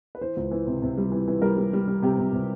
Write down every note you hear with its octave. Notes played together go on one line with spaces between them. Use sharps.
B4
E3 C5
C#2
E3
C3
C3
G3
E3
E3
G3 A#4
G3
G3
G3
C3 G4
C3
C3